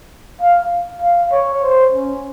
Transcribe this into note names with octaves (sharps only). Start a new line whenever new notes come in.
F5
F5
C#5
C5
C#4